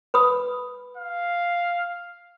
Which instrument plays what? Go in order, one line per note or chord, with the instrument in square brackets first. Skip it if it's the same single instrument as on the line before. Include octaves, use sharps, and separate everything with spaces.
[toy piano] B4 B5 D#6
[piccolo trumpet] F5